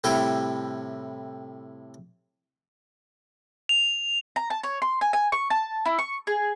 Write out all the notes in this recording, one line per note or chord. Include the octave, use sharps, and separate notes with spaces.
A2 C3 G3 E4 G5
F7
A#5
A5
C#5
C6
G#5
G#5
C#6
A5
E4
C#6
G#4